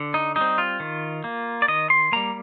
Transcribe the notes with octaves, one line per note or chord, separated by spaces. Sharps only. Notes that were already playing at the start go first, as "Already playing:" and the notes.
Already playing: D3
D#4
G3 D#4
C4
F4
D#3
A#3
D5
D#3 D#5
C6
G3 A#3 A#5